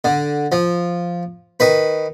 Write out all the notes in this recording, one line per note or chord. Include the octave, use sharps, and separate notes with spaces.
D3
F3
D#3 B4